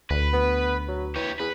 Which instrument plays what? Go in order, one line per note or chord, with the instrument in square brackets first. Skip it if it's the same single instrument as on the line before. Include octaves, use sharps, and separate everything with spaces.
[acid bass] D2 [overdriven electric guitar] B4
[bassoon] B3
F#3
[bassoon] E3 [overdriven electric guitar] G4 C#5
[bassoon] E2 [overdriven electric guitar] B4